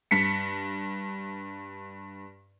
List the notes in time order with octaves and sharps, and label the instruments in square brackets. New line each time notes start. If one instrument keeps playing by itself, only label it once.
[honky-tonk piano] G2 B6 C#7